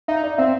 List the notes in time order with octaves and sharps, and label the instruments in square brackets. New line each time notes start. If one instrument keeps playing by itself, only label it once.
[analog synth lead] D#4 [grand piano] E5
[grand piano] D5
[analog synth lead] C4 [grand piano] E5